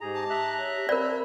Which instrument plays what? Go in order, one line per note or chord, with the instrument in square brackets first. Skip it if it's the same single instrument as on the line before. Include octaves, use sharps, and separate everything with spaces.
[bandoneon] G#2 G#4 A#5 [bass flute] G4
[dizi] A5
[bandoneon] E5 A#5 F#6
[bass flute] C#5
[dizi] G4
[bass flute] C4 [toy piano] A#4 D5 [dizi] B5